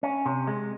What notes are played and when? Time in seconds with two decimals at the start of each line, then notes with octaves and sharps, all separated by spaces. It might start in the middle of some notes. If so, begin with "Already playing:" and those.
0.03 C#4
0.26 C3
0.47 G#3